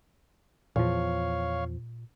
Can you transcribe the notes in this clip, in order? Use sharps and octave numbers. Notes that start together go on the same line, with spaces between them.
E2 A#2 F3 C#5 F5